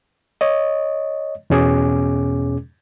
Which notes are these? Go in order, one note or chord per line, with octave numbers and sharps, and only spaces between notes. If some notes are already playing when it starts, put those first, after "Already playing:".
C#5 D#5
E2 B2 C#4 G#4 D6